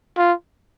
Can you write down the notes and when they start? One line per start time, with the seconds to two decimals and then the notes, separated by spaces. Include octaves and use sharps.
0.17 F4